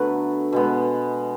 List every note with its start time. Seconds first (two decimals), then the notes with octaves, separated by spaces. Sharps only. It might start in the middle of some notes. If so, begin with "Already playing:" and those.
Already playing: D3 F#3 A3 B3 B4
0.53 B2 G#3 B3